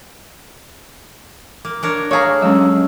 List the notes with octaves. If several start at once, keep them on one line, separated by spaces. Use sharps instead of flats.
A#3
D4 A#4 C#5
A3 G#4 C#5 F5 A#5
F#3 G#3 C#4 E6